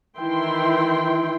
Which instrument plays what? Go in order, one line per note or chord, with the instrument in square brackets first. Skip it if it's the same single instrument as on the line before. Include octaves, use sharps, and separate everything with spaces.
[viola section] D#3 E3 E4 G5 C6